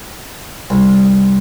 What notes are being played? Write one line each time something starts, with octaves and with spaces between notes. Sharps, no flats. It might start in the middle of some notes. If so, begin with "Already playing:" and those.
C2